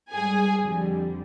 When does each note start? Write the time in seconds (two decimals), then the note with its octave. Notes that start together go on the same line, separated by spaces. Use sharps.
0.13 G#2 G3 G#4 G#5
0.65 F2 D3 G3